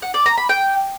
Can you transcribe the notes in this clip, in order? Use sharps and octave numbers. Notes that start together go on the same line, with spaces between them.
F#5
D5
A#5
B5
G5